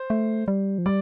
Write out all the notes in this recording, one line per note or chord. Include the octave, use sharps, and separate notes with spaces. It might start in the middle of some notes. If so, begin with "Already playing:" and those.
Already playing: C5
A3
G3
F3
G3 D5